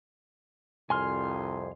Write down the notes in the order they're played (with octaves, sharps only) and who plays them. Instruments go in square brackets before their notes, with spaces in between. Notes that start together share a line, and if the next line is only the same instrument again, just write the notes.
[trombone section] C2 F2 [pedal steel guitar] G#5 C6 F6